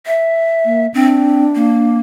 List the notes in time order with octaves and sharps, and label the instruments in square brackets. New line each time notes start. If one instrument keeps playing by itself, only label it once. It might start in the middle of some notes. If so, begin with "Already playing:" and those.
[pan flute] E5
[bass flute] A#3
[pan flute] C4 [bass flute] D4
[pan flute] A#3